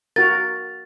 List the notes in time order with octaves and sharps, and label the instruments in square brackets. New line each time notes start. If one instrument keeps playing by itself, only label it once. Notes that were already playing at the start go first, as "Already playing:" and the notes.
[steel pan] F#4 A#4 [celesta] A6